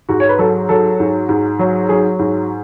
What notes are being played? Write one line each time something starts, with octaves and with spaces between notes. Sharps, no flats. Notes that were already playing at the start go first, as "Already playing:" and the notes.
G#2 F#4
C#5
B4
F#3 A4
F#3 A4
G#2
G#2
F#3
F#3 G#4
G#2